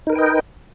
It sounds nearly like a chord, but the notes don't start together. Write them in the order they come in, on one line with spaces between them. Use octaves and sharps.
D#4 A#4 B4 G5 D#5